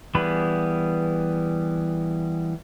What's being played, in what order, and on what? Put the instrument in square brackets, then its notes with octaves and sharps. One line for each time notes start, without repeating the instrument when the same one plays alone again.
[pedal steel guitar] E3 G3 B3 G#4 B5